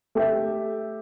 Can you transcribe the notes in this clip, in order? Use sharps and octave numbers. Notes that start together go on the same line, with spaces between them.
A3 G4 E5